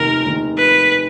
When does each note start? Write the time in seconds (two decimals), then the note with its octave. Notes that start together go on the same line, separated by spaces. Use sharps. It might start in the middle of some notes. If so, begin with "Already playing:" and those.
Already playing: F1 D#2 D#3 A#4
0.25 F1 D#2 D#3
0.58 B4